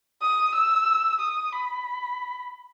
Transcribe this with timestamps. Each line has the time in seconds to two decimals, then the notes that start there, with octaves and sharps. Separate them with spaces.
0.21 D#6
0.54 E6
1.20 D#6
1.52 B5